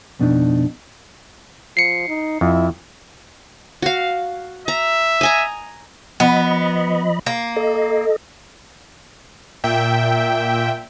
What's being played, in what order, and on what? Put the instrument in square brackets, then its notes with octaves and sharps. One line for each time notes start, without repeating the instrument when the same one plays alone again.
[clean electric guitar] F2 B2 D4 D#4
[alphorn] F3 [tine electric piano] C7 C#7
[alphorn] D#4
[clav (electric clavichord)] F2 [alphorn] E4
[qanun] F#4 F5
[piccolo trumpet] E5 [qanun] A#5
[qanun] D#5 G#5 A#5
[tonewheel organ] F3 D#5 B5 [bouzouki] B3
[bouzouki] A#3
[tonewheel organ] A4 D#5
[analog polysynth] A#2 E5 G5